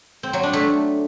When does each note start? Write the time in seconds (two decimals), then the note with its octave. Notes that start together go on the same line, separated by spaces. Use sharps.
0.23 C4
0.33 F#3
0.43 D4
0.53 A3